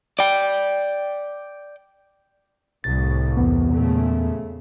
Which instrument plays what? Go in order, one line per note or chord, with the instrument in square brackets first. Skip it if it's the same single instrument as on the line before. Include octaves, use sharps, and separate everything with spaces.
[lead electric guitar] D5 G5
[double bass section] C2 A2 [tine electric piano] A6
[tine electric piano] E2 B3
[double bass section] A#2 C#3 A3